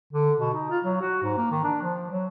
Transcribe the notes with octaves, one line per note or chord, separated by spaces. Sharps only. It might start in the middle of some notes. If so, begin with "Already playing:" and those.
D3
B2
D#4
F4
F#3
F#4
G#2
A#3
D#3
D4
F3
F#3